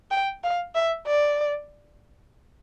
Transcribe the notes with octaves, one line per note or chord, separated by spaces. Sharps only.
G5
F5
E5
D5